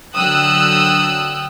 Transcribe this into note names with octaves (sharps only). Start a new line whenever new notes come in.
D3 F#3 G5 D#6 E6 F#6